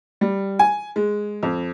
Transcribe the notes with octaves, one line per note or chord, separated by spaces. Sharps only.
G3
G#5
G#3
F2